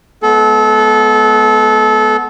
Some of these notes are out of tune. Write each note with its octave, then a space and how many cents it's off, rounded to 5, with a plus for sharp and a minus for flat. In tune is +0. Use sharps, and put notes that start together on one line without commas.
G#3 +30 B3 +0 A4 -25